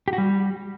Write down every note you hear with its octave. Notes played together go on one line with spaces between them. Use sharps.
G4
F#4
G3